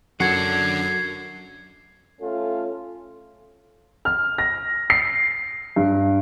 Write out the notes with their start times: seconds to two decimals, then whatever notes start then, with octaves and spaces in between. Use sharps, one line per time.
0.20 F#2 F#3 D4 F#4 A4 F#5 G#6 C7
2.21 A3 C#4 F4 A4
4.05 F6
4.38 A#6
4.90 C7
5.76 G2